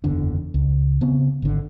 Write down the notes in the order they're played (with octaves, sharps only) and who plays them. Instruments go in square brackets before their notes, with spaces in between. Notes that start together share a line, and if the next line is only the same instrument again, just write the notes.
[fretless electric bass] F#1 E2 D3 D4
C#2
C#3 B3 C4
G#1 D3